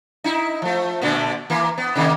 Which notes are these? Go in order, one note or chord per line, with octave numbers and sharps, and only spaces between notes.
D#4 E4
F3 A3
A#2 D3 A3
E3 A#3
B3
C3 D#3 A#3